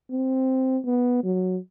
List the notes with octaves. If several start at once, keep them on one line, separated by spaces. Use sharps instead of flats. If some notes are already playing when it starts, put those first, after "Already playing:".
C4
B3
F#3